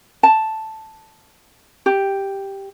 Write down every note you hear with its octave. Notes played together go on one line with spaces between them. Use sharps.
A5
G4